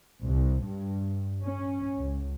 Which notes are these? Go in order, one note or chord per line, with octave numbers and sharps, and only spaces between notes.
C2
G2
C#4
C#2